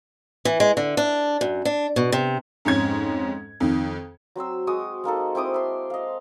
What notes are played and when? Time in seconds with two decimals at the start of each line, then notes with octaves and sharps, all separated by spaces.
0.45 E3
0.60 G#3
0.77 D3
0.97 D4
1.41 F#2
1.65 D4
1.96 B2
2.12 C3
2.65 F2 G#2 C#4 G#6
3.60 F2 D#3
4.36 F#3 C4 C5 E6
4.67 G#3 F#4 D#6
5.04 G#3 A#3 D#4 A4
5.35 C4 E4 D6 D#6
5.54 E5 C6
5.90 D#5 F5